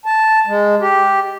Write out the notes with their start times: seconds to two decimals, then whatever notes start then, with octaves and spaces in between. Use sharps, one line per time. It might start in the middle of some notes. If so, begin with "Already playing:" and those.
0.06 A5
0.47 G#3
0.81 G4